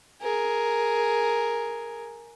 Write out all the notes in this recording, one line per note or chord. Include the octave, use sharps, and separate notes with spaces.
G#4 A#4